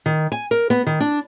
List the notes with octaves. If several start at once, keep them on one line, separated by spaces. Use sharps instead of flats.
D#3
G#5
A#4
B3
D#3
D4